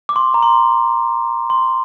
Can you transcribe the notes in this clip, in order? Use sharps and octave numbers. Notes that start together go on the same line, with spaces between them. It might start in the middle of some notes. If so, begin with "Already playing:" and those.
D6
C6
A#5
C6
C6